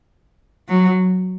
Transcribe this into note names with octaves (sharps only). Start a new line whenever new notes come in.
F#3